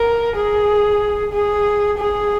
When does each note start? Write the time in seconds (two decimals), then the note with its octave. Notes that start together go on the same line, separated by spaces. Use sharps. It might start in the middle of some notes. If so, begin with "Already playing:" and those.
Already playing: A#4
0.36 G#4
1.33 G#4
1.98 G#4